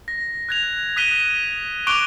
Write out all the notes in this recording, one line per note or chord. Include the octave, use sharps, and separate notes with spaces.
A#6
F#6 G#6 F7
D#6 F#6 B6 D#7 E7 G7
C#6 D6 F#6 D7 F7 G7